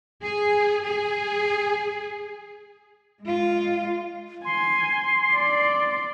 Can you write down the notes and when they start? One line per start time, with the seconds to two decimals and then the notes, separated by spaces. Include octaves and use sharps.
0.23 G#4
0.84 G#4
3.22 G#3 F4
4.45 G#5 C6
5.32 D5